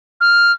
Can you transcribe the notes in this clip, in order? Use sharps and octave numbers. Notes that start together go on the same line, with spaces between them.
F6